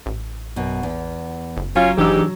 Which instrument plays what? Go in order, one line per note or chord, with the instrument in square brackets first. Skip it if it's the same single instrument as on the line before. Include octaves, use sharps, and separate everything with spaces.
[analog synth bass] A1
[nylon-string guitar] F#2 B2
E2
[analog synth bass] F#1
[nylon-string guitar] F#3 [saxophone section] C#4 F4
[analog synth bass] F#1 [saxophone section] G#2 G4 [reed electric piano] E3 D4 E6